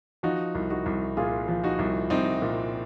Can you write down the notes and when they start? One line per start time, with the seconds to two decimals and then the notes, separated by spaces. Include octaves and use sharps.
0.23 F3 D#4 F#4
0.55 C2
0.70 D#4 F#4
0.86 C2
1.17 A#2 F4 G#4
1.48 F3
1.64 D#4 F#4
1.79 C2
2.10 C2 C4 D#4
2.42 A#2